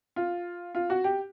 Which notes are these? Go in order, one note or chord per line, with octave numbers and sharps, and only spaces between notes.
F4
F4
F#4
G4